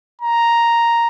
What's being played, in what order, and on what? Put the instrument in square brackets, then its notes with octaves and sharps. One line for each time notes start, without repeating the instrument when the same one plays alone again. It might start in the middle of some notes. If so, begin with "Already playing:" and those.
[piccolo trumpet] A#5